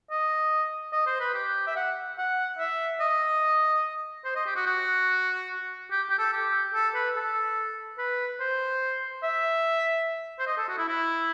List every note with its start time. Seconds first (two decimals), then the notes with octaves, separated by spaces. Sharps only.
0.11 D#5
0.93 D#5
1.06 C5
1.20 B4
1.34 G4
1.67 E5
1.76 F#5
2.18 F#5
2.59 E5
3.00 D#5
4.25 C5
4.36 D#5
4.46 G4
4.56 F#4
4.66 F#4
5.91 G4
6.10 G4
6.19 A4
6.33 G4
6.74 A4
6.95 B4
7.15 A4
7.98 B4
8.40 C5
9.23 E5
10.39 C5
10.47 D#5
10.58 A4
10.69 F#4
10.78 E4
10.89 E4